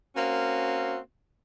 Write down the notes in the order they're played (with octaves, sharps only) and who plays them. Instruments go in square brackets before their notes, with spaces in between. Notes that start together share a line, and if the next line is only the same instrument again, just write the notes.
[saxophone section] A#3 C4 C#4 F#4